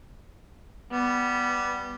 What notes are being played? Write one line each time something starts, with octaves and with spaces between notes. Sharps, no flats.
G3 B3